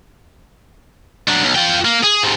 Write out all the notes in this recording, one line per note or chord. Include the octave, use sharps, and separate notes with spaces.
F#3 D4
B1
F4 G5
A#3
G#4
G#2 C3